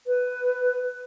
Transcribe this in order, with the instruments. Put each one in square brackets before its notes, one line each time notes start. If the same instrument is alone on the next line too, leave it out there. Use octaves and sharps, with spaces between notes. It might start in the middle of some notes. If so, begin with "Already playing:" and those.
[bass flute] B4